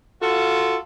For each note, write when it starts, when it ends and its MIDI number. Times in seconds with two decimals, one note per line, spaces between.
0.22 0.76 65
0.22 0.76 66
0.22 0.76 69